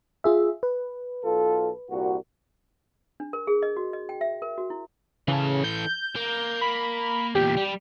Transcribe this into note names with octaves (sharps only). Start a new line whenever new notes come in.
F4 G#4 E5
B4
B1 F4 A4
C2 A#2 F#4
D4
A#4
G#4
D#5
F#4
D#5
G5
E5
A#4
F#4
E4
C#3 E3 A4
G6
A#3
B5
E2 A#2 G4
G3